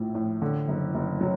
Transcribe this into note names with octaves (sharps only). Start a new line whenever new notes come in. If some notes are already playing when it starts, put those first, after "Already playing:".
Already playing: A#1 A2
A2
D3
F#1
F#1
F#3